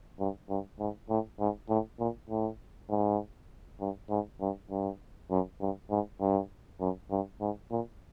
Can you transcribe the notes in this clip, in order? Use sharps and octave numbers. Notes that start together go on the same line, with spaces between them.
G2
G2
G#2
A2
G#2
A2
A#2
A2
G#2
G2
G#2
G2
G2
F#2
G2
G#2
G2
F#2
G2
G#2
A#2